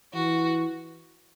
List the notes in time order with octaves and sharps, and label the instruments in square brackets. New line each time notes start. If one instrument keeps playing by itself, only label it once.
[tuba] E3 [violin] F#4